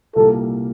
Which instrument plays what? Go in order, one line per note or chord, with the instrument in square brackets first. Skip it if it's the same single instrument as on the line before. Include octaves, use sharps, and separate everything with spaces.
[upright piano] C2 A#2 G3 A#3 [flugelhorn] A4